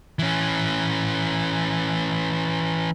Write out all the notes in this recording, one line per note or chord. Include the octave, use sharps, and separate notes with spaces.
E3 C#4